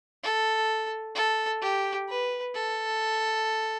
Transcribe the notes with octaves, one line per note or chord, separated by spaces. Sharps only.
A4
A4
G4
B4
A4